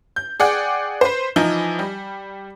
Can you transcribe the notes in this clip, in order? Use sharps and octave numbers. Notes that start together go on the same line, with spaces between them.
G6
G#4 D5 F#5 G5
B4 C5
E3 F3 D#4
G3